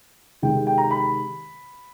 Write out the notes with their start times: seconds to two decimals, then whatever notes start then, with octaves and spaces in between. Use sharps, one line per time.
0.42 C3 D#3 G#3 G5
0.67 G5
0.78 A#5
0.91 B5